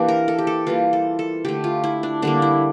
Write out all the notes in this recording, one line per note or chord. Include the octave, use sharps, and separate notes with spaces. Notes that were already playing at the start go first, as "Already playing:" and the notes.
Already playing: E3 A#3 D4 G4
A#4
A4
G4
A4
E3 G3 A#3 F4
A4
A4
D3 A3 G4
F4
E4
D4
D3 G3 A#3 D4
E4